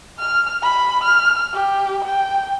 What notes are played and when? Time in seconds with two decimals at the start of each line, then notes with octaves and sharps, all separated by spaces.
0.19 F6
0.63 B5
1.04 F6
1.54 G4
2.05 G5